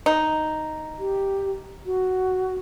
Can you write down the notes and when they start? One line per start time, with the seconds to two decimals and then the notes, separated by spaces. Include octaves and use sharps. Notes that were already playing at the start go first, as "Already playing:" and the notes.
0.06 D#4
0.99 G4
1.86 F#4